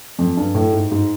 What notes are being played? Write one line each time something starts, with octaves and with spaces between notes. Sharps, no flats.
F2
G2
A2
G#2
G#2